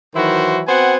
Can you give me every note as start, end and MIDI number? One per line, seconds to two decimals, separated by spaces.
0.15 0.61 51
0.15 0.61 52
0.15 0.61 54
0.15 0.61 64
0.15 0.61 66
0.15 0.61 72
0.67 0.97 59
0.67 0.97 60
0.67 0.97 66
0.67 0.97 72
0.67 0.97 78
0.67 0.97 80